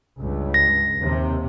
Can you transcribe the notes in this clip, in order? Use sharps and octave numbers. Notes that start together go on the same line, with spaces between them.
C#2 G2
A#6
D#2 C3